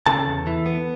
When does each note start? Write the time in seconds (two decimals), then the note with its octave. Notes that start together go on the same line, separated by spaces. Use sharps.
0.06 C#3 A4 A5
0.27 E2
0.47 E3
0.66 B3